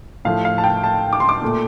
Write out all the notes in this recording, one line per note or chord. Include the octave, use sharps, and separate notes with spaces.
A2 F3 A3 F5
F5
A5
G5
A5
D6
C6
D6
A#2 A3